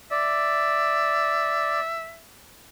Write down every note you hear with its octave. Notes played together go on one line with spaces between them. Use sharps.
D5 E5